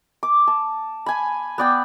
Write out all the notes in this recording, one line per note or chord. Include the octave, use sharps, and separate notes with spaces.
D6
A5
G#5 B5
B3 D5 G5